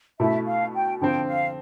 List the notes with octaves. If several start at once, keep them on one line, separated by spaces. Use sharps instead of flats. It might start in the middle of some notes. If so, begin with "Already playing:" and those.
B2 A3 E4 E5
F5
G5
D3 F3 C4 G5
F5